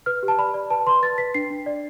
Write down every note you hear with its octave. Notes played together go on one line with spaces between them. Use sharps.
B4 F6
G4
A5
D5 B5
D5
B4 A5
B4 C6
B4 A6
B4 B6
D4 C7
D4
D5